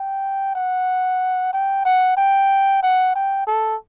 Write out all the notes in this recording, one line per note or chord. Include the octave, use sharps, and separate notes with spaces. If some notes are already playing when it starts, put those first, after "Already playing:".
Already playing: G5
F#5
G5
F#5
G5
F#5
G5
A4